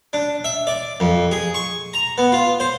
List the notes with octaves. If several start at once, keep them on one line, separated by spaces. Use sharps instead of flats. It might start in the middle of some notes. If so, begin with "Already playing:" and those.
D4
E5
D5
F2
G#4
C#6
A#5
B3
F4
C5